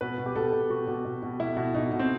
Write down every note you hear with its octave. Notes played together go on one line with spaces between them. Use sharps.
B2 B4
B2
G4
B2 A4
B2
B2 F#4
B2
B2
B2
B2 E4
B2
B2 D#4
B2
C4